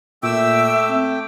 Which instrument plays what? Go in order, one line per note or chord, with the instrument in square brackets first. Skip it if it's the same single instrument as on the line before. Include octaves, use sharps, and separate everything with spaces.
[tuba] A#2 [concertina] A3 G5 D6 [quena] E5 [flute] E6
[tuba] C4